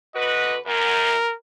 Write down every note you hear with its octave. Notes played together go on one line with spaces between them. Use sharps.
D3 F#4 B4 D#5
F#2 A#4